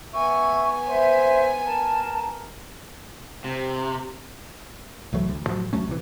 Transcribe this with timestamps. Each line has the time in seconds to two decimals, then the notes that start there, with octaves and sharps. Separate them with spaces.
0.14 B3 E5 G#5 C#6
0.89 C5 E5
1.66 A#4 A5
3.44 C3
5.13 C2 E3 F#3 A3
5.29 D2
5.46 A2 F3 F#3
5.73 D#2 F#3 A3 C#4
5.88 A#1 C3 E3